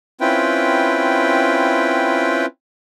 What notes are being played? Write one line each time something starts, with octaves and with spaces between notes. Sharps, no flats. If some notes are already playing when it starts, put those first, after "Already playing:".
C4 C#4 E4 F4 B4 G5